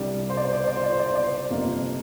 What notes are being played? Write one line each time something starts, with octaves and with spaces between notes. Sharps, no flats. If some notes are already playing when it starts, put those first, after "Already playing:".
Already playing: C2 C3 G3 D4 D5
C5
D5
C5
D5
C5
D5
C5
D5
C5
D5
C5
D5
C5
G1 F2 C3 A#3 D4